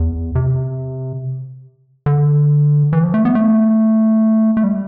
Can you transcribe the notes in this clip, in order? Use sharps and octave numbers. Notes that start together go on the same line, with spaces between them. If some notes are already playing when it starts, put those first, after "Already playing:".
Already playing: E2
C3
D3
E3
F3
A3
B3
A3
A3
G3